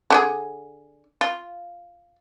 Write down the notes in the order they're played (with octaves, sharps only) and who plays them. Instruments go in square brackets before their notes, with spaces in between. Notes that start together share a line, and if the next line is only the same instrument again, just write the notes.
[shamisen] D3 G4 G#4
F4